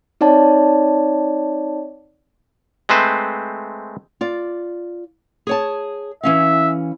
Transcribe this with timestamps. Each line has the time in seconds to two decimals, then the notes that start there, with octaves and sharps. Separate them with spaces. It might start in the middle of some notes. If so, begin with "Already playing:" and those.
0.21 C4 D#4 C#5 D5 A5
2.89 G#3 A3 C4 B4 C5
4.21 F4 D5
5.47 G#4 C#5 A5
6.23 E3 C#4 E5 F5